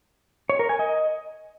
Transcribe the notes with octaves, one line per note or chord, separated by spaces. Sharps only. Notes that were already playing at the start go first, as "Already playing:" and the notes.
C#5
A#4
G#5
D#5